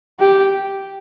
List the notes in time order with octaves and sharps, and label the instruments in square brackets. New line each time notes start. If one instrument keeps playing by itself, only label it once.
[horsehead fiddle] G4